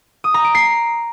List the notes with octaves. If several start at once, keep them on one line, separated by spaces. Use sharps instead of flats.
D#6
A#5
D7
C7